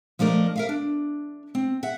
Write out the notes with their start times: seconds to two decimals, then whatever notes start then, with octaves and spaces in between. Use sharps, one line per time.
0.19 F3 A3 D4 A#4 D#5
0.56 A#4 E5 F5
0.69 D4
1.55 C4
1.83 E5 F#5